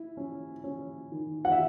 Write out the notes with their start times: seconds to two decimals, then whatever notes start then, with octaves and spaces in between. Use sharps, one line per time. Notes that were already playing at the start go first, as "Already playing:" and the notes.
Already playing: E4
0.17 C#4
0.64 C#4
1.12 D#3
1.45 F#5
1.52 E5